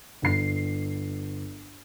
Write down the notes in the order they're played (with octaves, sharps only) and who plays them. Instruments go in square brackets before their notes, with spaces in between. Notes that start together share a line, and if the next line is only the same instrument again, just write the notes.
[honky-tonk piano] G1 C7